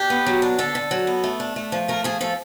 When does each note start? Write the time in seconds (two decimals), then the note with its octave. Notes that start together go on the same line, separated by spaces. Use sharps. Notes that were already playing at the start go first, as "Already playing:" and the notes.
Already playing: D4 G4
0.10 B3
0.26 F#3
0.42 D4
0.58 D3 A4
0.75 D3
0.91 F#3
1.07 B3
1.24 A3
1.40 D4
1.56 A3
1.72 F3
1.88 A3 A#4
2.04 F3 G#4
2.21 F3 A4